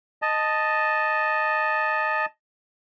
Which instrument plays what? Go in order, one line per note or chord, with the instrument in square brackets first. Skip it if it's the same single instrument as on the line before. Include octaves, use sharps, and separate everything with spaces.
[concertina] D#5 A5